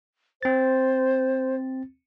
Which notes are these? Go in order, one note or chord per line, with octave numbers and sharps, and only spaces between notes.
C4 C5 A6